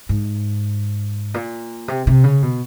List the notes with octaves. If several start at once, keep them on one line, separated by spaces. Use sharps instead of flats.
G#2
A#2
C3
C3
C#3
B2